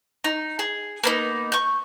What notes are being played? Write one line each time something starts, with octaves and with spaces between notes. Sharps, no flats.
D#4
G#4
A#3 B3 D#4
C#6 G6